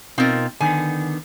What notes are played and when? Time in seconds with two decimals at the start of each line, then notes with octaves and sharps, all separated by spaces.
0.18 B2 C4 D#4 F4 A#4
0.61 D3 D#3 B3 G#5